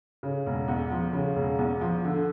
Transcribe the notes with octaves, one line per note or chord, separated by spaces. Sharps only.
C#3
E1
E2
F3
C#3
E1
E2
F3
D3